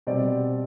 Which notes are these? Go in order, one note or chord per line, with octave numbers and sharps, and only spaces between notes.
B2 G3 C4 D5